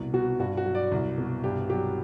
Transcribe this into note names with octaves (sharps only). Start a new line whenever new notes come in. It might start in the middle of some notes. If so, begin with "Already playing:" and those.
Already playing: C2 B2
B2 F#4
G2 F#4
F#4
F#3
D5
C2
B2
G2 G4
F#3 G4